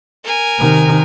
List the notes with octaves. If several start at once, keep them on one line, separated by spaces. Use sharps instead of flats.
A#4 G#5
C3 D#3